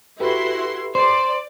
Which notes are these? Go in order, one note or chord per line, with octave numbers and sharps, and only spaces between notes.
E4 F#4 G4 A4 B4 C6
C5 D5